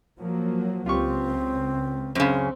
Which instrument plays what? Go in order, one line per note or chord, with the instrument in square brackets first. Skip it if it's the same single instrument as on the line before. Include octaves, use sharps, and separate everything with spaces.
[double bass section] F3 F#3 A#3
[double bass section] C#2 [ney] C4 [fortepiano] F4 G4 C#6
[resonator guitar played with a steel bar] F#2 C#3 [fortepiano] C4